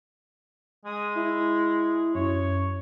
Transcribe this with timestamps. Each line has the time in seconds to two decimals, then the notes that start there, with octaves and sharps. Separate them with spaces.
0.86 G#3 D#6
1.15 E4
2.15 F#2 C#5